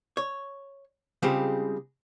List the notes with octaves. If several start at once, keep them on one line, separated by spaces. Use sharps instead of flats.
C#5
C#3 G3 G#3 C4 F4 G4